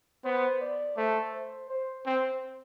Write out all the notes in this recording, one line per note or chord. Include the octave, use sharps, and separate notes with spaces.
B3 C5
D5
A3 C5
C5
C5
C4 C5